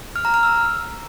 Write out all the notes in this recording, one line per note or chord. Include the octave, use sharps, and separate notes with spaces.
F6
A#5
F6
E6